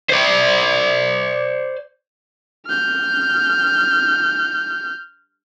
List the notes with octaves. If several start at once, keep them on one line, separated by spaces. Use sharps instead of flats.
C5 D5
F6 G6